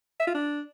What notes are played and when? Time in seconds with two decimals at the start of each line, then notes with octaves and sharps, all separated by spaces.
0.20 E5
0.27 F4
0.34 D4